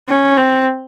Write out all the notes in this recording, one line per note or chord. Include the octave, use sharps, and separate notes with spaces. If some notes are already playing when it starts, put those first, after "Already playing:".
C#4
C4